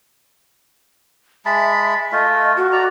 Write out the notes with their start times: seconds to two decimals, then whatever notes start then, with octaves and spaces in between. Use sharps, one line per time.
1.45 G#3 E5 A5 B5
2.12 A3 F4 D#5
2.57 F#4
2.72 D5 A#5